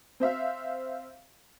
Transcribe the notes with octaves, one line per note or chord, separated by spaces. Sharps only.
C4 C5 E5 F5